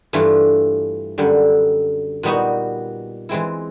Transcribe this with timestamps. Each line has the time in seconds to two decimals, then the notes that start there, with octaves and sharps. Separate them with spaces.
0.13 G2 E3 A3 D4 F4
1.18 F#2 D3 G3
2.23 A#2 G3 B3 D#4 F#4
3.29 E3 G#3 C4 E4